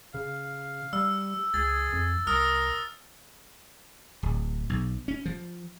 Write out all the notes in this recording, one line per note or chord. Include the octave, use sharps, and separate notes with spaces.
C#3 F5
G3 E6
C#2 G#4 A6
F2
C2 A#4 D#6 F6
D1
B1
C#4
F3